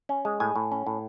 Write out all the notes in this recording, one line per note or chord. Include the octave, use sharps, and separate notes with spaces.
C#4
G#3
A2 G#5
A2
C#4
A2